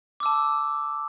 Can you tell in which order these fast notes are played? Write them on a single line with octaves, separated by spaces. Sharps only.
D6 E6 A5